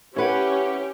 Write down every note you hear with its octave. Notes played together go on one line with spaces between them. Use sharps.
C#4 E4 G4 B4 C#5 F#5